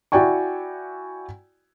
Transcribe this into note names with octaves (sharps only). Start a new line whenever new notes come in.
E4 F#4 D5 G5 G#5 C#6